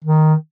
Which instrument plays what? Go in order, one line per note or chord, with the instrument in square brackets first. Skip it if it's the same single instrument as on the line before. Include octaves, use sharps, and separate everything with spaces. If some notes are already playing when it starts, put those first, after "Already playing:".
[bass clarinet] D#3